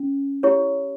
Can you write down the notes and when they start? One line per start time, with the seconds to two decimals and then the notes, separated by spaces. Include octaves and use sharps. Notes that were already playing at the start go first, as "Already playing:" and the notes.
Already playing: C#4
0.43 E4 G4 C#5